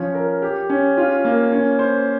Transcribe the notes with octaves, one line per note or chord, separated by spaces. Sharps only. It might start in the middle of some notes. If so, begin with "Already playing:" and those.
Already playing: F3 C#4
A#4
G4
C#4
F4
A#3
C#4
C5